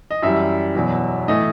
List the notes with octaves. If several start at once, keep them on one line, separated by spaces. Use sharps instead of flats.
D#5
F#2 E3 G3 E5
E2 B2 F#3
A2 E3 A3 D#5